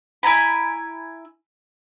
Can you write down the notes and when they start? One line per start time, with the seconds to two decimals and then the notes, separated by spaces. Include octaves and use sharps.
0.23 E4 G#5 A#5 B5